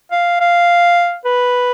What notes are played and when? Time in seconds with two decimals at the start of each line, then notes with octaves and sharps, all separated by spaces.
0.12 F5
0.40 F5
1.25 B4